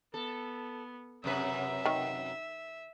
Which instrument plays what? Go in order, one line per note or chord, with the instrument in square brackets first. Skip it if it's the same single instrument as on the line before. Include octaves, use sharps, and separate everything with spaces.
[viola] B3 [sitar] A4
[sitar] F#2 C3 B4 [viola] E5
[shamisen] D#3